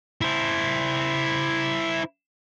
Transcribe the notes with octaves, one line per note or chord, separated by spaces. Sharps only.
E4 C5